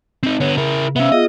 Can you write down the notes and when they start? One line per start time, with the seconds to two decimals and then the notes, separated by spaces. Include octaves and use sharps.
0.23 C4 D#4
0.40 D3 B3 C#5
0.58 C#3 E4 A#4
0.96 C3 B3 C#4 E5 F5 E6
1.12 B3 F4 G#4 D#5